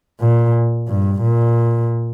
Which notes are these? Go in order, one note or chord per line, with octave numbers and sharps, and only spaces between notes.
A#2
G2
A#2